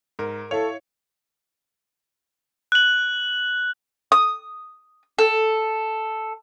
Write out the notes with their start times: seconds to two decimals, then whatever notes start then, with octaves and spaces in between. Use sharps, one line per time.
0.19 G#2 A#4
0.51 E4 A4 C#5 F5 F7
2.72 F#6 F#7
4.12 D#6
5.18 A4